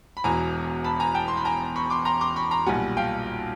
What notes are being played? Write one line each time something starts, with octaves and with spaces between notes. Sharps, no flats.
B5
E1 E2 B2 G#5 A#5
A5 B5
G#5 A#5
G5 A5
C6
B5
G#5 A#5
B5 C#6
C6 D6
A#5 C6
C6 D6
B5 C#6
A#5 C6
B1 A#2 G3 F#5 G#5
F5 G5